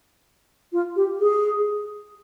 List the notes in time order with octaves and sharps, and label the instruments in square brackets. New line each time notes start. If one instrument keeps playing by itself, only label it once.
[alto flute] F4
G4
G#4